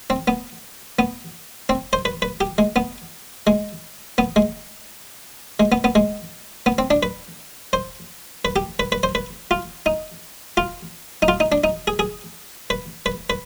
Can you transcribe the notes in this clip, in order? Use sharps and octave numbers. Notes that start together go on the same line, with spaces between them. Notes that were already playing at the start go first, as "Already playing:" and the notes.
C4
B3
B3
C4
C5
B4
B4
G4
G#3
B3
G#3
B3
G#3
G#3
B3
B3
G#3
B3
C4
D4
B4
C5
B4
G4
B4
B4
C5
B4
F4
D#4
F4
D#4
F4
D#4
D4
D#4
G#4
G#4
B4
B4
B4